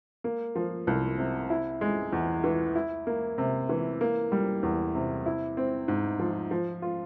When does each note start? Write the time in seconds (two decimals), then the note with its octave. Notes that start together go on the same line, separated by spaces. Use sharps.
0.24 A#3
0.56 F3
0.87 C2
1.18 C3
1.50 E4
1.81 G#3
2.13 E2
2.44 E3
2.75 E4
3.07 A#3
3.38 C3
3.69 E3
4.01 A#3
4.32 G3
4.63 E2
4.95 C3
5.26 E4
5.57 C4
5.88 G#2
6.19 F3
6.51 F3
6.82 F4